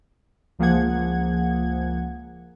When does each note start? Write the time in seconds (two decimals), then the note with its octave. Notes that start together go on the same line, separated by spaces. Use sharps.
0.59 C#2 F3 A#3 G#4 F#5 G#6